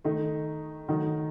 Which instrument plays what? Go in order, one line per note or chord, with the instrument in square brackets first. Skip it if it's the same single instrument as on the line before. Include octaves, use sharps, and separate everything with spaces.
[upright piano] D#3 A3 D#4
D#3 F#3 A3 D#4